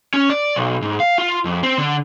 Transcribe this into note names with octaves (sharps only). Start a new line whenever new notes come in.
C#4
D5
B1
G#2
F5
F4
F2
C4
D3